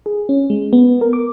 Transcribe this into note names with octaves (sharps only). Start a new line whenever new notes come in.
G#4
C#4
G#3
B3
A#4
D6